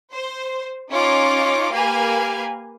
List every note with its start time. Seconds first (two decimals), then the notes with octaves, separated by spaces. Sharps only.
0.13 C5
0.90 C#4 D#4 F4 D6
1.72 A#3 G4 B4 F5 G#5